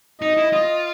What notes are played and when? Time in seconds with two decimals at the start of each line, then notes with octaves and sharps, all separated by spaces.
0.21 D#4 D#5
0.37 E4
0.53 F4